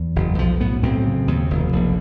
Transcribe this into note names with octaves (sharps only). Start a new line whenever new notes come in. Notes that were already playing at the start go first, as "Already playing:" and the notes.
Already playing: E2
F#1
B1 F3
A2 B3
B1 C4
C#3
D#2
F1
A#1